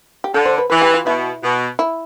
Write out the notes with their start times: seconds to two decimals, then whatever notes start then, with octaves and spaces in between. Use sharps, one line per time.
0.24 G4
0.34 D3 A4
0.45 C5
0.58 B4
0.70 E3 B4
0.82 G4
0.94 F4
1.06 B2 E4
1.43 B2
1.79 E4